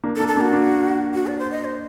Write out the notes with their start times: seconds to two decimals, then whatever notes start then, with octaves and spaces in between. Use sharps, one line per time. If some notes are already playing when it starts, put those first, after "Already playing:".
0.04 A#3 D4
0.16 A4
0.20 A#3 D4
0.28 A4
0.36 A#3 D4
0.41 F#4
0.53 A#3 D4
1.14 F#4
1.27 D5
1.39 C5
1.51 D#5
1.65 C5